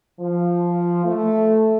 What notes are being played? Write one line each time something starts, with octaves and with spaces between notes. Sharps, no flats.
F3
A3